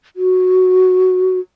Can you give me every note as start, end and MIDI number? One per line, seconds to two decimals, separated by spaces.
0.16 1.40 66